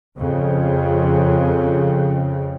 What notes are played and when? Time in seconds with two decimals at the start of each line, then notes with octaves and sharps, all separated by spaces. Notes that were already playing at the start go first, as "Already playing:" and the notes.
0.18 F2 C#3